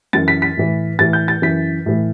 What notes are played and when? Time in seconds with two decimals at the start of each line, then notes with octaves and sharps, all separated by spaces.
0.13 F#2 E3 A6
0.28 B6
0.42 B6
0.57 A2 E3
0.99 A2 E3 A6
1.13 G6
1.28 A6
1.42 F#2 E3 B6
1.86 A2 E3